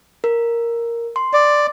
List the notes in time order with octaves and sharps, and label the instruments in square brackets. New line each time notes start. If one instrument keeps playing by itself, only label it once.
[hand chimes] A#4
C6
[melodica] D5